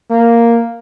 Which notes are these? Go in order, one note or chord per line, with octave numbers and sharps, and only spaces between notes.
A#3